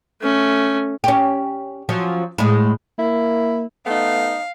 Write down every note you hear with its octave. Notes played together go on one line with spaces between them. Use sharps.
A3 C#4
C#4 G4
F3 F#3 C#4
A2 G#3
A#3 E4
A3 B3 D#4 F5